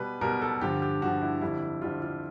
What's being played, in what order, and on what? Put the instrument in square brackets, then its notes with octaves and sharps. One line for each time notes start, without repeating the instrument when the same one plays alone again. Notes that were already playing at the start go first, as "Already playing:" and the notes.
Already playing: [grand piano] B2 G3 B4
B2 G3 A#4
A4
G2 D3 F3 G4
G4
G2 D3 F3 F#4
E4
F2 D3 G3 E4
F2 D3 G3 F4
F4